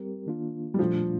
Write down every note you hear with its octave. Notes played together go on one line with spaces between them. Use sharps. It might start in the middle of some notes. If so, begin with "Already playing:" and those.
Already playing: G3 C4 G4 A#4
D#3 A#3 D4 F4
G3
A#2 F3 A3 D4 F4